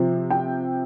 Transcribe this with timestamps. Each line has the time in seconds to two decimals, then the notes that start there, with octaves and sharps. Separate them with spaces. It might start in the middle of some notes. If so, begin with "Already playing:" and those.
Already playing: C3 F3 C4
0.30 G5